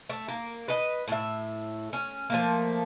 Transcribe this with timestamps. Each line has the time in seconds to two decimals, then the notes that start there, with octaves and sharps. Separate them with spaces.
0.10 A3
0.28 A#3
0.68 B4 D#5
1.08 A2 E5
1.93 C#4
2.30 F3 A3 A#3